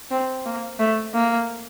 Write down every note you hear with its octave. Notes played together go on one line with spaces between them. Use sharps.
C4
A#3
A3
A#3